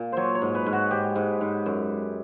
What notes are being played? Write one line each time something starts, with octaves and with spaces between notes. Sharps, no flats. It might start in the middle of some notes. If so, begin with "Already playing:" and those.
Already playing: A#2
F#3 C5 C#5
C#5
G#2
B4
G#2
F#4
G#2 G4
G#2
G#2
F#2